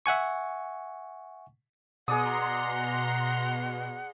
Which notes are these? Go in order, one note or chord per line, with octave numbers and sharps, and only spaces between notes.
E5 F#5 G#5 C#6
B2 G#4 D5 F#5 A#5 C6 D#6